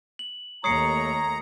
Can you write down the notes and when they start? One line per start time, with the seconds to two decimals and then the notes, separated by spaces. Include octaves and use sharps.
0.19 F#7
0.64 D#2 A3 C#5 A#5 D#6 C7 C#7